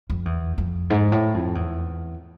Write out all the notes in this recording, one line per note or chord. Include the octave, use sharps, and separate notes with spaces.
F2
E2
F2
G#2
A2
F2
E2